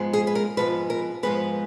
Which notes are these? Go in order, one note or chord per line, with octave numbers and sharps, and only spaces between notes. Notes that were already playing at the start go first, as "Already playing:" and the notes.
Already playing: G#2 F3 G#3 B3
G#4
B4
A#4
G#2 F3 G#3 B3 B4
A#4
G#2 F3 G#3 B3 B4